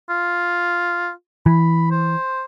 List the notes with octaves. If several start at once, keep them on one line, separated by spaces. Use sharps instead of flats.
F4
E3 B5
C5